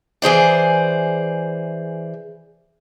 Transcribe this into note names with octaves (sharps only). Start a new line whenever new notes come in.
E3 G#4 C5 D5